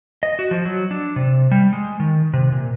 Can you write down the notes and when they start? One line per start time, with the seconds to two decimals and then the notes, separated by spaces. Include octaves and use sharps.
0.23 D#5
0.39 F#4
0.51 F3
0.65 F#3
0.91 D4
1.16 C3
1.51 G3
1.73 G#3
2.00 D#3
2.33 C3
2.52 A#2